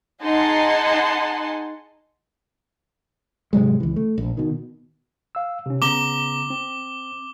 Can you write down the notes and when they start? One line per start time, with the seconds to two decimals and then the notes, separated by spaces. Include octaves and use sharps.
0.21 D#4 G#4 F#5 G#5 A5 C6
3.53 G#2 C3 F#3 G#3
3.80 C#2 E3
3.96 A3
4.18 A#1
4.37 B2 D#3
5.35 F5 E6
5.66 C3 C#4
5.82 C#3 B3 A#5 D6 G7
6.50 C4